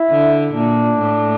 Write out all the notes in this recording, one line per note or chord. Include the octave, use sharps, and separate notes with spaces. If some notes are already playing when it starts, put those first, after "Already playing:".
Already playing: E4
D3
A#2 D4
A2